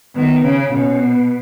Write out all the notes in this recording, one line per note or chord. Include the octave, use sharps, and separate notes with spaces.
D#3 B3
C#3 C#4
B2 C#4
B3